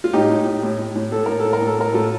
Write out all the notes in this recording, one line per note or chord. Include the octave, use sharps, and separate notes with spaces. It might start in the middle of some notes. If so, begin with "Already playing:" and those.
F4
A2 D#4 G4
A2
A2
A2
A2
A2
A2 A4
A2 A#4
A4
A2
A#4
A2
A4
A2 A#4
A2 F4 A4